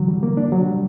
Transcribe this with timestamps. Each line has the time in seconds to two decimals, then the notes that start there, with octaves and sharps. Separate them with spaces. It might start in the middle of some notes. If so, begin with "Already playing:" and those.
Already playing: D3 E3 F#3
0.08 G3
0.23 A#3
0.37 D4
0.52 F#3
0.67 G3